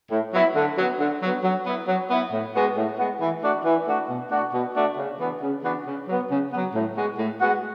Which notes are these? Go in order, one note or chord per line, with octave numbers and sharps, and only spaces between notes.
A2
F#3 B3 E4
D3
F#3 B3
D3
F#3 B3
F#3
B3 E4
F#3
B3 E4
A2
G#3 B3 F#4
A2
G#3 B3 F#4
E3
A3 D4 F#4
E3
A3 D4 F#4
B2
A3 D4 F#4
B2
A3 D4 F#4
C#3
E3 B3 D4 F#4
C#3
E3 B3 D4 F#4
C#3
F#3 B3
C#3
F#3 B3
A2
G#3 B3 F#4
A2
G#3 B3 F#4